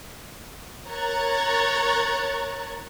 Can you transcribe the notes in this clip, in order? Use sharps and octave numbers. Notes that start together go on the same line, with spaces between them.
A#4 C#5 A#5 F#6 G#6 A6